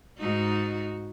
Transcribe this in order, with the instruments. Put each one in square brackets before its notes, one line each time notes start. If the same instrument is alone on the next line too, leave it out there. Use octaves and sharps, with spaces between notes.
[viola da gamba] G#2 D#4 F#4